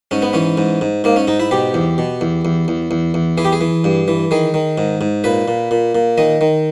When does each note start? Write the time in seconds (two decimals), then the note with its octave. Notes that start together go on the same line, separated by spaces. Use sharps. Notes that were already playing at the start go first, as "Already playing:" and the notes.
0.11 G#2 C#4
0.22 B3
0.33 E3 C#4
0.58 G#2
0.81 G#2
1.04 G#2 A#3
1.16 C#4
1.28 G#2 D#4
1.40 E4
1.51 B2 G4
1.74 E2
1.98 B2
2.21 E2
2.45 E2
2.68 E2
2.91 E2
3.14 E2
3.38 E3 G#4
3.45 G4
3.52 G#4
3.61 E3
3.84 G2
4.08 E3
4.31 D#3 G#4
4.54 D#3
4.78 G#2
5.01 G#2
5.24 A#2 B4
5.48 A#2
5.71 A#2
5.95 A#2
6.18 D#3 D#5
6.41 D#3